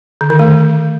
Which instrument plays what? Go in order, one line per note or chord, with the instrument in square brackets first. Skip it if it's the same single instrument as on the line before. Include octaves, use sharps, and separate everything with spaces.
[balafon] D3
D#3
A3